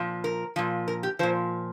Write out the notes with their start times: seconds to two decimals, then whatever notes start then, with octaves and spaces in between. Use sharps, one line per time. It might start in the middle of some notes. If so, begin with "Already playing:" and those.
Already playing: A#2 F3
0.24 A#4
0.56 A#2 F3
0.88 A#4
1.03 G4
1.19 A#2 F3 C5